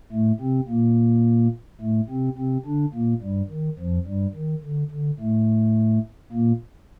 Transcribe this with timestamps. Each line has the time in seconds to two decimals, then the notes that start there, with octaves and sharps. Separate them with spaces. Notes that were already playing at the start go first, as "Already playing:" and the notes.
0.12 A2 A3
0.40 C3 C4
0.69 A#2 A#3
1.81 A2 A3
2.09 C3 C4
2.38 C3 C4
2.66 D3 D4
2.94 A#2 A#3
3.22 G2 G3
3.50 D#3
3.79 F2 F3
4.06 G2 G3
4.35 D#3
4.64 D3
4.91 D3
5.20 A2 A3
6.32 A#2 A#3